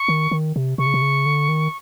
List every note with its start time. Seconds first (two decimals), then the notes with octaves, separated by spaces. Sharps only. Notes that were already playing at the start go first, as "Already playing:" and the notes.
Already playing: C#6
0.08 D#3
0.31 D#3
0.56 C3
0.78 C3 C#6
0.86 C#3
0.94 C3
1.02 C#3
1.26 D3
1.49 D#3